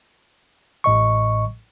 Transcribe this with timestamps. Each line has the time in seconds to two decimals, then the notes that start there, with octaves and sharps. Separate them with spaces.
0.84 A1 A2 D#5 C#6